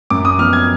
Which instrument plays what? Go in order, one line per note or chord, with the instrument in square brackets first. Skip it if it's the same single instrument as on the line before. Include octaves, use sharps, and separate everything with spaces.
[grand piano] F#2 D6
D#6
F3 B3 F6
G#6